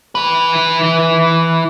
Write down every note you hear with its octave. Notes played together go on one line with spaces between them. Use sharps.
E3 B4